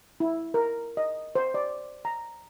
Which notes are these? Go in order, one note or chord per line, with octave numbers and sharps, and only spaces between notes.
E4
A#4
D#5
C5
D5
A#5